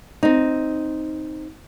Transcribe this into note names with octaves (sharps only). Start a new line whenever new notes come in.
C4 D#4